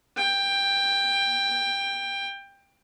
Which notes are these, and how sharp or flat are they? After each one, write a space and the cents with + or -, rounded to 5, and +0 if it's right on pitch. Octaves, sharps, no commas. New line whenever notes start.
G5 +15